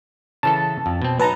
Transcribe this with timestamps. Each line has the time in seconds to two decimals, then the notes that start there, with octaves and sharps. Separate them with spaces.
0.43 C#3 E3 A4 A5
0.86 F2
1.02 B2 C4
1.19 F#3 D#4 B4 A5 A#5